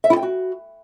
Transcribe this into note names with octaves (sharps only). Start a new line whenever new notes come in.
E5
E4
G5
F#4